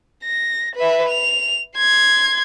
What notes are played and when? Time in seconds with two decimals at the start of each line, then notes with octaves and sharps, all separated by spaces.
0.24 A#6
0.76 B4 E5
1.09 F7
1.78 C6 G#6